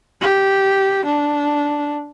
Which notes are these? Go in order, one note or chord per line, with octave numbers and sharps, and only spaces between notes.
G4
D4